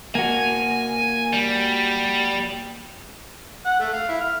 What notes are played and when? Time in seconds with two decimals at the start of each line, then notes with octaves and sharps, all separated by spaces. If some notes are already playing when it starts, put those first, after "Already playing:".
0.15 A#3 F#4 G#5
1.33 G3
3.66 F#5
3.80 A3
3.93 F5
4.09 E4
4.21 F6